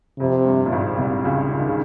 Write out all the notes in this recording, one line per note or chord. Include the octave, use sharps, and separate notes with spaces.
F2 C3
G2
A#2
G#1 G#2
C2 C3
C#2 C#3
C#3
D#3
C#3